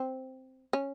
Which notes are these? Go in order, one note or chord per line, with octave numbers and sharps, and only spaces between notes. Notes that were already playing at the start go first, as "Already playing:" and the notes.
Already playing: C4
C#4